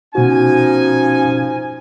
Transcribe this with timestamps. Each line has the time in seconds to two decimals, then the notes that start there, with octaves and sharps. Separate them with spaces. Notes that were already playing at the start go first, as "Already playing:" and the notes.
0.15 B2 F3 C#4 D#4 F#4 G#5